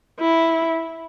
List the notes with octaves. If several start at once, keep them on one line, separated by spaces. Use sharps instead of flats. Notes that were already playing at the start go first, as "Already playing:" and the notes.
E4